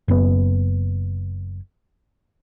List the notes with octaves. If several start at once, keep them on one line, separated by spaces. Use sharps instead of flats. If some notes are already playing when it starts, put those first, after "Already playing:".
F#1 B3